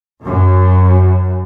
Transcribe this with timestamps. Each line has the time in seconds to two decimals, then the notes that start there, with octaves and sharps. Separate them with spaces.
0.24 F#2